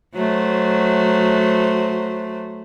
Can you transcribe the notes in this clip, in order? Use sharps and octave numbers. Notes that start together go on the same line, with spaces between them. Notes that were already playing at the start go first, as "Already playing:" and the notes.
F#3 A3 C5